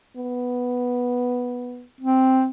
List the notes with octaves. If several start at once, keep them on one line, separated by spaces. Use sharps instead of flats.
B3
C4